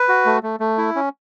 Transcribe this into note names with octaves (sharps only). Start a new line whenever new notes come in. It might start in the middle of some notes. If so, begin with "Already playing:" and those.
Already playing: B4
F#4
A3
A3
A3
E4
C#4